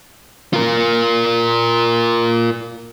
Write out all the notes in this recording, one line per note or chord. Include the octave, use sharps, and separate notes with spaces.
F4 A#4